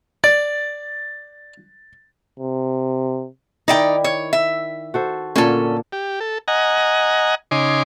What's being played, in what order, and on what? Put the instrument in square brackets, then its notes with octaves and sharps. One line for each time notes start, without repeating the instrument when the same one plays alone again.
[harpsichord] D5 [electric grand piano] A6
[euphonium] C3
[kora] D#3 E4 [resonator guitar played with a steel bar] D#4 D5 G5
[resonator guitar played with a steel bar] C#5
E5
[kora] F#4 A4 C5
[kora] A#2 D3 A#3 [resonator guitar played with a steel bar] C#4 A4
[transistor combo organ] G4
A4
D#5 F#5 G#5 A#5
C#3 D#4 G#5 C6 D6